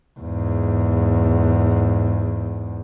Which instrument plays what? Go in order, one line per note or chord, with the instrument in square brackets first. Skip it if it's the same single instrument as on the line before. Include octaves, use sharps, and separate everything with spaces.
[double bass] E2 G#2